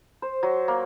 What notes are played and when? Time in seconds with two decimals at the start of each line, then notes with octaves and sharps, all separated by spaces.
0.22 C5
0.43 F#3
0.68 A#3